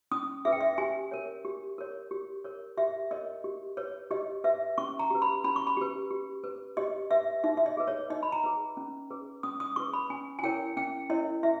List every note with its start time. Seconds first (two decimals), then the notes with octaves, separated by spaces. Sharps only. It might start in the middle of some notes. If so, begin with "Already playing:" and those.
0.11 C#4 D#6
0.45 G#4 B4 E5
0.52 G5
0.61 E5
0.78 G4 G#5
1.11 A#4 C#5
1.45 G4
1.78 A#4 C#5
2.11 G4
2.44 A#4 C#5
2.77 G4 E5
3.11 A#4 C#5 D#5
3.44 G4
3.77 B4 C#5
4.11 G4 D#5
4.44 B4 E5
4.78 C#4 C#6
4.99 A#5
5.10 G4 B4
5.22 B5
5.44 C#4 B5
5.56 C#6
5.67 B5
5.77 G4 B4
6.11 G4
6.44 B4
6.77 G4 D#5
7.11 B4 E5
7.44 D#4 E5
7.57 E5
7.66 D#5
7.77 G#4 B4
7.88 C#5
8.10 D#4 D#5
8.23 B5
8.32 A#5
8.44 G#4 B4
8.77 C#4
9.11 G#4 B4
9.43 C#4 D#6
9.60 D#6
9.76 G#4 B4 C#6
9.93 B5
10.10 C#4 G#5
10.39 G#5
10.43 E4 A#4 C#5 G5
10.77 C#4 G5
11.09 E4 A#4 C#5 D#5
11.43 E4 E5